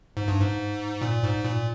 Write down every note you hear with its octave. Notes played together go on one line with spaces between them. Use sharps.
G#2
G2
G#2
A#2
G#2
A#2